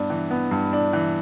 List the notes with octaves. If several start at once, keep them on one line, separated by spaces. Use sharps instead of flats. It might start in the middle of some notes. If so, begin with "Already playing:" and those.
Already playing: G2 B3 D4
E3
B3
G2
D4
E3